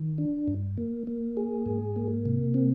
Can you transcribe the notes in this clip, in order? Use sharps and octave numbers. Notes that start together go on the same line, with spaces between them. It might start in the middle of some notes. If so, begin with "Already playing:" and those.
Already playing: D#3
D4
G2
A#3
A#3
G#4
G#2
A#3
C3
C4